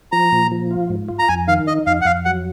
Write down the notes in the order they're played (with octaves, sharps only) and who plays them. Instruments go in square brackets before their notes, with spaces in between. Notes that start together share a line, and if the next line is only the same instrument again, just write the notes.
[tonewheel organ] F3 [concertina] A#5
[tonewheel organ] A#2
F3
F4
G#2
F4
[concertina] A#5
[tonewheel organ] F2 [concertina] G#5
[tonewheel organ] D#3 [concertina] F5
[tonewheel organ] D#4 [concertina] D#5
[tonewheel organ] F2 [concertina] F5
[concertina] F#5
[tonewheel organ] F2 [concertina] F5
[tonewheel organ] F#3 [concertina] F#5